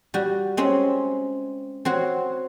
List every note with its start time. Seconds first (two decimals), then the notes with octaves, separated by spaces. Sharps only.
0.14 G3 F#4
0.57 G#3 C4 C#4
1.85 C4 F#4 C#5